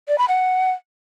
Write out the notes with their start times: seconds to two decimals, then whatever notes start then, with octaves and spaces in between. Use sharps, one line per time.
0.08 D5
0.18 B5
0.28 F#5